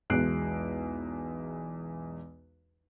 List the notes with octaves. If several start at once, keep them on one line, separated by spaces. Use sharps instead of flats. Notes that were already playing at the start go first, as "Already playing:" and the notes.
B1 E2 G#3 F#6 C7 D7